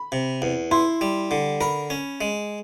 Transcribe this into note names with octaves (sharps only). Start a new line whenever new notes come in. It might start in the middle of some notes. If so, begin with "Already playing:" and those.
Already playing: B5
C3
E2
E4 C6
G3
D3
A#4 B5
C#4
G#3